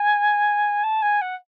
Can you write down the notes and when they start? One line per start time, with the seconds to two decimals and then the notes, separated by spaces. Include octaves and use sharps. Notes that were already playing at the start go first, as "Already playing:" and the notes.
Already playing: G#5
0.83 A5
1.02 G#5
1.21 F#5